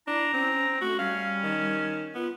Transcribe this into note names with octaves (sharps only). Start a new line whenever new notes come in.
D4 E4 A#5
C4 C#4
A3 F#4
G3 C#4 F5
D#3
B3 F4